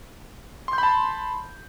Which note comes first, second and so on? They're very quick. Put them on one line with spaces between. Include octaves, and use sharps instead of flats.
C6 G6 B5 A5